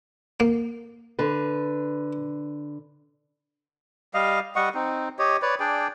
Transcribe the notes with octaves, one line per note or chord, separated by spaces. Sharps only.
A#3
D3 B4
G3 D#5 F5
G3 D#5 F#5 C#6
C4 D#4
G4 C#5 D#5
B4 C#5 D5
D4 G#4 D5 G5